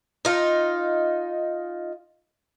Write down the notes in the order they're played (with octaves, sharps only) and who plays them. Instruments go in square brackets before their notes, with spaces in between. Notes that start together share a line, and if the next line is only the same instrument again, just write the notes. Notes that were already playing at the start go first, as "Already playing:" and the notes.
[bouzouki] D#4 F4